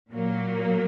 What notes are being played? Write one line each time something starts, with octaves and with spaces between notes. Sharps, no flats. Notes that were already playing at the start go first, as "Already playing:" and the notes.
A#2 F#3 A#3